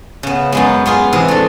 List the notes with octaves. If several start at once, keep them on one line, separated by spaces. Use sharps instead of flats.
C#3 B3
F#2 G#3 B3
B3 F4 G#4
C3 E3 G#4
A3 D4